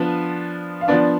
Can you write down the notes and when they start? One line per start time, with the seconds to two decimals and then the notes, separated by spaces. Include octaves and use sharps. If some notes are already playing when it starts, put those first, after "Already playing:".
Already playing: F3 B3 D4 A5
0.81 F5
0.88 F3 B3 D4 D5